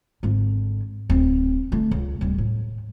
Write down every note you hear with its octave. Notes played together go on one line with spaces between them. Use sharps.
G#1 D3
D1 C4
D3 A3
C#2
D1 G3
A2